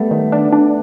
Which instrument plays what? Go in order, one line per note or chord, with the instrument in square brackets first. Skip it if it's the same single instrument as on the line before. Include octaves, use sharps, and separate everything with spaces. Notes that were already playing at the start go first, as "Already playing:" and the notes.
Already playing: [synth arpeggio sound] G3 [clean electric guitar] A3 B3
[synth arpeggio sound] D#3
D4
D4